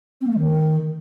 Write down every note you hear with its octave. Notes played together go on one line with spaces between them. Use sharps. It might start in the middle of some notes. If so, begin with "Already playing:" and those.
C4
A#3
A3
D#3